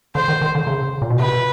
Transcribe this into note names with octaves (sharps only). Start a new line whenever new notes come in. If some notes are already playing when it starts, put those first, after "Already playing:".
D3 C5
D#3
D#3
D3
C#3
A#2
B2
C3 B4